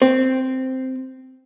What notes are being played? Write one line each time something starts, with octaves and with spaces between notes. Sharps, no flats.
C4